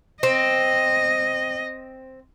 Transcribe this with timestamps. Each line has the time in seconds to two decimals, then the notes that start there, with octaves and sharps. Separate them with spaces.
0.23 C4 D#5